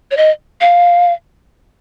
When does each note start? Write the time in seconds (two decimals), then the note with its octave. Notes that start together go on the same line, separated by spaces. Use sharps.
0.11 C#5
0.17 D#5
0.61 F5